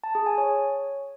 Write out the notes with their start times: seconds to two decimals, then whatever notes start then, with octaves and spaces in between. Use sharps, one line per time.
0.04 A5
0.15 G#4
0.26 G#5
0.38 C#5